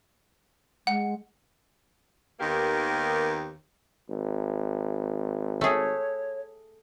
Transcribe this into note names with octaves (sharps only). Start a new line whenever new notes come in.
G#3 F#5
D#2 D#3 A#3 B3 G4 A#4
G#1
A3 G#4 C#5